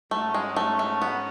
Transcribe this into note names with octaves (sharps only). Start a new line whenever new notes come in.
G#2 F#3 A3 C#4 F#4
G#3
A3
A3
B3